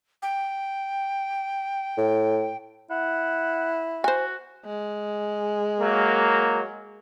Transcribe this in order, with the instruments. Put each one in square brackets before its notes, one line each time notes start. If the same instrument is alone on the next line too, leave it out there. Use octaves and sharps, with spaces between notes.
[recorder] G5
[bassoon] A2
[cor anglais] E4 [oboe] F#5
[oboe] F#4 [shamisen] C5 G#5
[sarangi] G#3
[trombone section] F#3 A#3